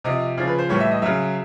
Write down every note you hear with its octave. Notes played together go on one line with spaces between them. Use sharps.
C3 F3 D#5
C#3 F3 D5
B4
C5
A2 E3 G3 C#5
E5
D#5
C#3 F#3 E5